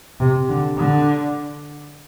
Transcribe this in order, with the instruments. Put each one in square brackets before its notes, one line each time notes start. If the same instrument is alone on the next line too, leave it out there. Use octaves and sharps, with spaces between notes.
[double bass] C3
D3
D3